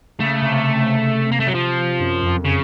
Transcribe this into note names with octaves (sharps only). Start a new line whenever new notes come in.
C#3 A3
C3
A#3
A3
F#3
F3
F#2
F2
C#3